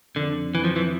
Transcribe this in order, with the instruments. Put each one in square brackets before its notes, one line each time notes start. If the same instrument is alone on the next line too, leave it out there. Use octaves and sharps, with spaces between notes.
[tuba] F2 [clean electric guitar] D3
[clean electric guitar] E3
F3
E3